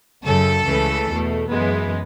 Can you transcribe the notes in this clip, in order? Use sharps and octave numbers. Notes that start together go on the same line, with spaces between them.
F#2 C#3 F#3 A4
C#2 C#3 E3 A3
E2 B2 A3
F#2 E3 G#3 B3